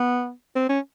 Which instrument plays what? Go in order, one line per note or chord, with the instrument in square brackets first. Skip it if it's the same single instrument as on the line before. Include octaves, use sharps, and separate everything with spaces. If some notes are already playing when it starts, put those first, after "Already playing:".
Already playing: [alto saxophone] B3
C4
C#4